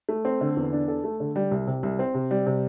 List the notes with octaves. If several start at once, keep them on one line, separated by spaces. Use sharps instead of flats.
A3
C4
D3
E2
D4
A4
A3
D3
G3
C2
C3
C2
C4
C3
G3
C3